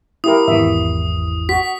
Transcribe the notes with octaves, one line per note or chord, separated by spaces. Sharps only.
E4 G4 A#4 D#6
G#1 E2 E3 E5
F#4 B6